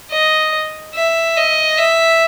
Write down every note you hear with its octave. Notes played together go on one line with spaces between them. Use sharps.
D#5
E5
D#5
E5